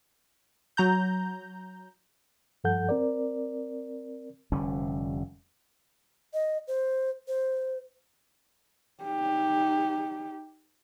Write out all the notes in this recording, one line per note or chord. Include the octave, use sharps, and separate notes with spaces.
F#3 A#5 G6
G2 F3 A4 F#5 G6
C4 A#4 D5
F1 D3 G3 C#4
D#5
C5
C5
D#4 G4